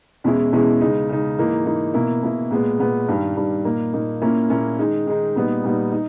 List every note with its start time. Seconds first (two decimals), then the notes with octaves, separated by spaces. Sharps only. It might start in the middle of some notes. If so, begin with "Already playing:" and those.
0.24 E2 B2 G#3 C#4 E4
0.53 E2 B2 G#3 C#4 E4
0.81 C#3 G#3 D#4
1.09 C#3 G#3 D#4
1.38 G#2 E3 A#3 D#4
1.66 G#2 E3 A#3 D#4
1.94 B2 A#3 E4
2.23 B2 A#3 E4
2.51 A#2 G#3 B3
2.79 A#2 G#3 B3
3.08 G2 D#3 G3
3.37 G2 D#3 G3
3.65 A#2 A#3 D#4
3.93 A#2 A#3 D#4
4.22 A#2 A#3 C#4 E4
4.50 A#2 A#3 C#4 E4
4.78 D#3 G#3 D#4
5.07 D#3 G#3 D#4
5.36 A#2 G3 B3 D#4
5.64 A#2 G3 B3 D#4
5.92 D#4